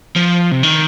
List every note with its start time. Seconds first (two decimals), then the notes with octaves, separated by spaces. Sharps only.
0.16 F3
0.51 C3
0.63 D#3